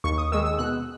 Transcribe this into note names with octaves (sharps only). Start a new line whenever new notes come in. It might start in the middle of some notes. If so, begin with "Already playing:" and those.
D#2 C#6
D#6
D#3 G#3 E6
E6
B2 F#6